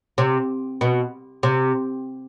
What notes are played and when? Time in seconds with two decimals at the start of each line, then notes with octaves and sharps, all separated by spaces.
0.18 C3
0.81 B2
1.43 C3